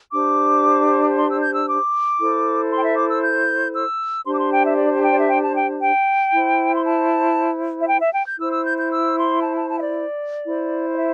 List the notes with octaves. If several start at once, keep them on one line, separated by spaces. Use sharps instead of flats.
D4 G4 C5 D6
C6
E6
G6
E6
D6
E4 A4 C5
C6
G5
E5
D6
E6
G6
E6
D4 G4 C5 C6
D6
C6
G5
E5
D5
A5
G5
D5
E5
G5
A5
G5
G5
E4 C5
C6
A5
E5
G5
E5
G5
G6
E4 C5 E6
E6
G6
G6
E6
C6
A5
A5
A5
E5
D5
E4 C5
D5
E5